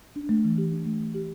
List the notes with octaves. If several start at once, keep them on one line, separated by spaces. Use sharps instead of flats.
D4
A3
E3
G4
D4
A3
E3
G4